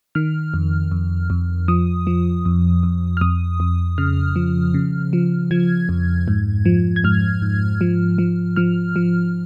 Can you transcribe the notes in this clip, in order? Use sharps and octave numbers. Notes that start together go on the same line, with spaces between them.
D#3 F6
F2
F2
F2
F3 D#6
F3
F2
F2
F6
F2 D#6
F2
C#3 F6
F3
C#3
F3
F3 G#6
F2
G#2
F3
G#6
G#2 F6
G#2
F3
F3
F3 F6
F3